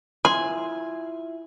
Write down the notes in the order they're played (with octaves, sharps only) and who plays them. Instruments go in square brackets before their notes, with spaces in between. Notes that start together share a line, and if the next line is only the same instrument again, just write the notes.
[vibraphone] E4 F4 E5 [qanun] G#5 [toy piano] C6